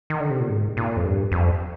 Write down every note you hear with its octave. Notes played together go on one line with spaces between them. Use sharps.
D#3
D3
C3
A#2
G#2
A#2
F2
G2
F2